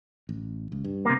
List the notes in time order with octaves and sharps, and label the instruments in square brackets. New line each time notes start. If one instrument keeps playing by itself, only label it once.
[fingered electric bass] A1
C#2
G2
[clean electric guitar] C3 A#3